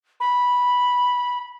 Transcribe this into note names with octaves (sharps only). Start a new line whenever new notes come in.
B5